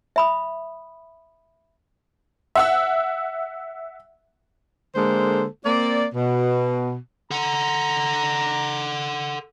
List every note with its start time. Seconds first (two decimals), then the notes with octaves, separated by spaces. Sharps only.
0.16 E5 B5 D#6
2.55 E5 F#5 E6
4.96 D3 G#3 A#3 A4 C5
5.65 A#3 C4 D5
6.15 B2
7.31 A4 F#5 A#5